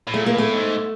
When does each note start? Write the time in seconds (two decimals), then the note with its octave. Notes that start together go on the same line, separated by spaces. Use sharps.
0.07 A2
0.14 A#2 A3
0.26 A#3
0.34 A2 A3
0.53 G#2